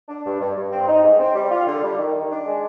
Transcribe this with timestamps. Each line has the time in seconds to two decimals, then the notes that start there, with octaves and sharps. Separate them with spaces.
0.08 D4
0.24 G2
0.40 G2
0.56 G2
0.71 C4
0.87 D#4
1.03 G#2
1.19 C4
1.34 G3
1.50 F4
1.66 D3
1.82 G3
1.98 D#3
2.14 D#3
2.30 D4
2.46 G#3